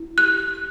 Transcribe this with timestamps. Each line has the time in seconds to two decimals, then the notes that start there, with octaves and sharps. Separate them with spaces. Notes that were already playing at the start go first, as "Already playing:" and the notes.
Already playing: E4
0.18 G4 F#6